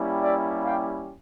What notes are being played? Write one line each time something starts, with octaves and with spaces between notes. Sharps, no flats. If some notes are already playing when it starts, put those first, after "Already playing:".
Already playing: G3 A#3 C#4 E4 G4
D5 E5
F5 G5